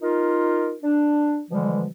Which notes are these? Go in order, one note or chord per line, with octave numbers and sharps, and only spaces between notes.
D#4 F4 A#4
D4
B2 D3 E3 F3 G3 G#3